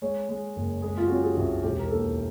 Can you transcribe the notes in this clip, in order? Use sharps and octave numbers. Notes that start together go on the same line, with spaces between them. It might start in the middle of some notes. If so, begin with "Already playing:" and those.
G#3 C#5
G#3
F#1
G#3 G#4
F4
C#4 F#4
G4
G#4
C2
E1 G4
A#4
D#2 A4